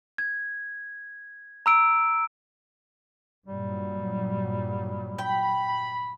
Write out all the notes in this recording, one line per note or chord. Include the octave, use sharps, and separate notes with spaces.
G#6
A#5 E6 D7
G2 A#2 F#3 G3
G5 B5